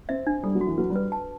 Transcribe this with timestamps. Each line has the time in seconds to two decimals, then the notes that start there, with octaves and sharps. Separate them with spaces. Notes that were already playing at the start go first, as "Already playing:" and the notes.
0.09 C4 E5
0.27 D4
0.43 G3 A4
0.55 F#3
0.61 F#4
0.66 E3
0.78 F#3 B4
0.90 G3
0.96 B4
1.12 A5